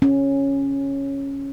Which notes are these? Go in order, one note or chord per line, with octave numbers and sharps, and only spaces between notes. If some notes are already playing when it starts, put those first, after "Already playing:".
C#4